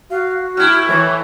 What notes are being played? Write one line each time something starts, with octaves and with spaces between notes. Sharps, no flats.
F#4 F5
A2 E4 F6
E3 C#5